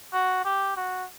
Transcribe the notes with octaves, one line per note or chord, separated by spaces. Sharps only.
F#4
G4
F#4